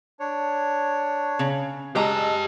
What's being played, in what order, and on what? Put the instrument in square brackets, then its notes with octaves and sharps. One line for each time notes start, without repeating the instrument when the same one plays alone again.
[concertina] D4 C#5
[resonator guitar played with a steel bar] C#3
[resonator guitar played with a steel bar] G#3 D#5 A#5 [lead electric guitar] G4 A5 [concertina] E6